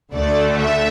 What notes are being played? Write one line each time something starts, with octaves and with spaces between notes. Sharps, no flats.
D2 D3 A3 D5
E5